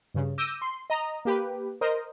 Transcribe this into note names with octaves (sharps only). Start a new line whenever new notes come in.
G2 C#3
D6 E6 G6 A#6 D#7
C6
D#5 A#5
A#3 G4 B4
A#4 C5 D#5